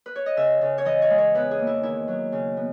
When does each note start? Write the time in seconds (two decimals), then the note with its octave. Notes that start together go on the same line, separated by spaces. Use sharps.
0.06 B4
0.16 C#5
0.26 D#5
0.37 C#3 E5
0.61 C#3
0.78 C#5
0.85 E3 D#5
1.02 C#5
1.10 G#3
1.18 C#5
1.34 E2 B4
1.51 G#4
1.59 A#3
1.67 E4
1.83 D#3 E4
2.08 F#3
2.32 C#3
2.57 B3